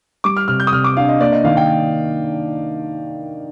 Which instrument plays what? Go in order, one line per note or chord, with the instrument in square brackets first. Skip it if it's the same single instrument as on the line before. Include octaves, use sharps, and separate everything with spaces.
[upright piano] G3 [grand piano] D6
[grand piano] F6
[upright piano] C3 [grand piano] F6
[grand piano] G6
D#6
[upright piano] C3 [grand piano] F6
[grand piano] D6
[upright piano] D4 [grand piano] F5
[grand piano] D#5
[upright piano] A#3 [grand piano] D5
[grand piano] D#5
[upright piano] D#3 [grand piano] F5
[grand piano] G5